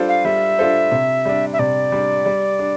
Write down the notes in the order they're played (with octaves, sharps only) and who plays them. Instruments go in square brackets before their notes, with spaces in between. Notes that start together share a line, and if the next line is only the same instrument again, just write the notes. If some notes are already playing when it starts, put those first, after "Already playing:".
Already playing: [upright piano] G3 D4 F4 A4 C5
[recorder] F5
[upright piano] G3 [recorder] E5
[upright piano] D4 F4 A4 C5
C3
G3 D4
[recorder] E5
[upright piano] C3 [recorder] D5
[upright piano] G3 D4
G3
D4